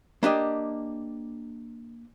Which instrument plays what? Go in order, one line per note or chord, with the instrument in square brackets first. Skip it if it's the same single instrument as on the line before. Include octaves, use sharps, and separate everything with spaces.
[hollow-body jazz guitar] A#3 D4 G4 D#5